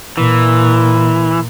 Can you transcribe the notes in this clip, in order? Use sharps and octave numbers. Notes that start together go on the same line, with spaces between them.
A#2 E3